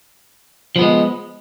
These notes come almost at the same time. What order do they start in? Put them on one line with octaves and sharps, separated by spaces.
F3 B3 G#3